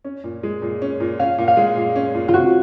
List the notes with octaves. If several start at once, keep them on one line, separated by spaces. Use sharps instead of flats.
C#4
A#2
G#3
A#2
C#4
A#2
C#4 F5
A#2
F5
G#3
A#2
C#4
A#2
F4
C4 F#4